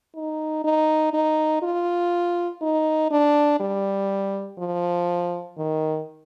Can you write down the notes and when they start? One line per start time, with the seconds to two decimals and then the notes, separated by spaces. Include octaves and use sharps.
0.15 D#4
0.64 D#4
1.14 D#4
1.63 F4
2.62 D#4
3.11 D4
3.60 G3
4.59 F3
5.58 D#3